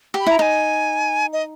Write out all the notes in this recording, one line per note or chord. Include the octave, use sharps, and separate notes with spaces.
G4
B5
E4 A#5
D#4 G#5 A#5
D#5